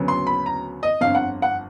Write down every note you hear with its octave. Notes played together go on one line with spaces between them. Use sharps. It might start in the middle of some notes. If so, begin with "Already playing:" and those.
Already playing: D2 C#3 F#3 B3
C6
B5
A#5
D#5
G1 F2 D3 F5
F#5
F#5